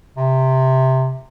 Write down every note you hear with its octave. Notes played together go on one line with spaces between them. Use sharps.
C3